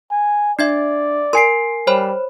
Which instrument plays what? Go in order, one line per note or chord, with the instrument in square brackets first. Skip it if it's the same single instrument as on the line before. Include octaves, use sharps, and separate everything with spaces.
[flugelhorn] G#5
[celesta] D4 [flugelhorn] D5 [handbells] E5 G#6 C7
[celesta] A#4 G#5 C7 [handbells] C6 D7
[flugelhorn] G3 [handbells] C5 C#5 B5